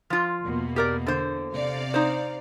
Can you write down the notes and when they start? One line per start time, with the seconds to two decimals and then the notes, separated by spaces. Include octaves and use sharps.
0.10 F3 F4
0.41 E2 B2 A#3
0.76 G4 A#4 D5
1.06 D3 C5
1.53 C3 D5 F5
1.94 D#4 C5